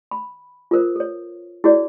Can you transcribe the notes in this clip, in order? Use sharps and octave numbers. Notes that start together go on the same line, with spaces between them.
B5
F4 A4 A#4 C5
A4 C#5
E4 F#4 G#4 C#5 D5